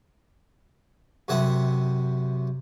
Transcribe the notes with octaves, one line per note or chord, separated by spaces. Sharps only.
F#2 C3 E5 F#5